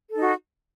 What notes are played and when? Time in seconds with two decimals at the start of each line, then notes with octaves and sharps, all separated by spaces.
0.09 A4
0.14 D#4
0.19 F#4